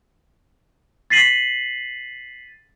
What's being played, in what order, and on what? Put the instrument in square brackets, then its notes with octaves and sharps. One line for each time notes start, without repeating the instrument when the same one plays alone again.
[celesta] A6 B6 C7 D#7 F#7